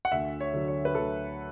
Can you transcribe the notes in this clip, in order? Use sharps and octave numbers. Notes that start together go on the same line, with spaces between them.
F#5
D2 E5
C#5
D3 F#3
C#5
B4
D2 A4